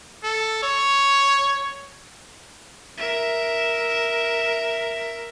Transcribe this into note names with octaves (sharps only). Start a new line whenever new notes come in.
A4
C#5
A#4 E5